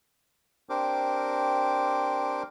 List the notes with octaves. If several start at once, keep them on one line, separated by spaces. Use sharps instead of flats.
C4 D4 G4 A#4 C5 D6